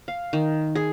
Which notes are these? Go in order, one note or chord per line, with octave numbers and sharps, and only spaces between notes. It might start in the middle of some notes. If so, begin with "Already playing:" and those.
F5
D#3
G#4